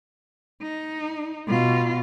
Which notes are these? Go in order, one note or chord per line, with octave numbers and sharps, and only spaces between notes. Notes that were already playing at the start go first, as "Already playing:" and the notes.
D#4
B2 F4